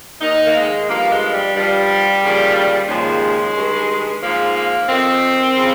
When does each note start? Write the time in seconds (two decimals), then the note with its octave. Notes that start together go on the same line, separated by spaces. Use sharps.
0.21 D#2 D#3 D#4
0.45 A#3
0.55 G#3
0.88 G2 F3 A#3
1.11 G#3
1.34 G3
1.56 G2 F3 G3
2.22 D#2 C#3 F3
2.88 D#2 C#3 F3 G#3
3.55 G2 D#3
4.22 G#2 F3 A#3
4.55 A#3
4.88 F2 D#3 C4
5.57 C#3 F3